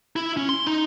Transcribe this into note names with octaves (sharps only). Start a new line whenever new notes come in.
E4
C#4
C6
D#4